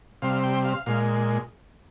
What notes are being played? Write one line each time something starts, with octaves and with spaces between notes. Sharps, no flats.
C3 G3 C4 F5
G5
F5
A#2 G#3 F5